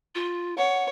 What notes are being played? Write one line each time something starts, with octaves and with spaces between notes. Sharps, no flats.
F4
C#5 F#5